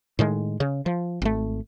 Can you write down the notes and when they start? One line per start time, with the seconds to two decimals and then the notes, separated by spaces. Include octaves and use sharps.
0.19 A2 D#3 G#3
0.60 C#3
0.86 F3
1.22 G#1 A3